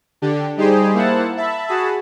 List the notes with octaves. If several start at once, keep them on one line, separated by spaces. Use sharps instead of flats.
D3 D4 G4
G3 D#4 G4 G#4 C5
A#3 E4 C5 F#5 A5
E5 A5 B5
F#4 G#4 A5 B5